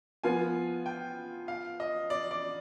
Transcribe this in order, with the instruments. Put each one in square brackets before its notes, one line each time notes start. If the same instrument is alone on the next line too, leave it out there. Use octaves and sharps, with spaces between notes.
[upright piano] F3 B3 F4 [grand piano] G#5
[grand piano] G5
F5
D#5
D5
D5